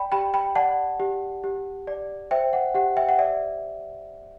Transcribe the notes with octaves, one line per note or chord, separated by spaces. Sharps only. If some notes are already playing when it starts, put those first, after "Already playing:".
Already playing: D5 G5 B5
G4 G5 B5
G5 B5
D5 F#5 A5
G4
G4
D5
C5 E5 G5
F#5
G4 F#5
E5 G5
F#5
D5 E5